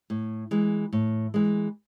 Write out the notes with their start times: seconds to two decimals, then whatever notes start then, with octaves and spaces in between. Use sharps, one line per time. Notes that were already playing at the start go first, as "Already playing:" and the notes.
0.10 A2
0.51 E3 G#3
0.93 A2
1.34 E3 G#3